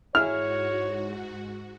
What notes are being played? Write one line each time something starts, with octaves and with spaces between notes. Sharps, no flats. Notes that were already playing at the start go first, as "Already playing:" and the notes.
G#2 E4 F#4 G#4 C#5 F6